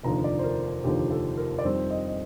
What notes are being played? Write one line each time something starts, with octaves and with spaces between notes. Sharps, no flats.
F1 D#2 D3 F3 A#5
D5
C5
A#4
F1 D#2 D3 F3 G4
A4
A#4
D5
F2 D#3 G3 C4 C5
D#5
D#5